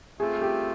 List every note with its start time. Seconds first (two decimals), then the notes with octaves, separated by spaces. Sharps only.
0.19 A3 C4 F4 G#4
0.41 G4